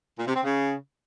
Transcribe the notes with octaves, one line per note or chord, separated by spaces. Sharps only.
A#2
C3
C4
C#3